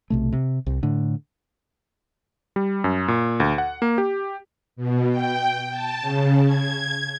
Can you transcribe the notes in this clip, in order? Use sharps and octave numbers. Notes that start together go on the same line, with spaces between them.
B1 C3 A3
C3
C2
A2 D3
G3
F#2
A#2
D2
F#5
A#3
G4
B2
G5
A5
C#3
G#6